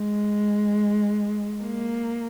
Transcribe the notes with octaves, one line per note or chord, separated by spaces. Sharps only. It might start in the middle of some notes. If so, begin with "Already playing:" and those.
Already playing: G#3
A#3